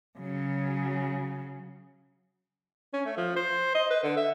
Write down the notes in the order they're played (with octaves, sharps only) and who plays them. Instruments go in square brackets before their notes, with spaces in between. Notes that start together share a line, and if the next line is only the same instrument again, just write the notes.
[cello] C#3 F#3
[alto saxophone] C#4
A3
F3
C5
D#5
B4
D3
E5